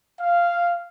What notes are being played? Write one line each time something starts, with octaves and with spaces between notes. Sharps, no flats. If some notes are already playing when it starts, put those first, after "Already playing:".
F5